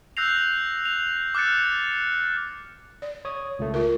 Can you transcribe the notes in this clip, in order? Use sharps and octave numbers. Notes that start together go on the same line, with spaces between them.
E6 F#6 G6 A#6 C7 F7
F7
D6 F6 F#6 A6 C#7
D5
C#5 D#6
C#2 A3
F4 A#4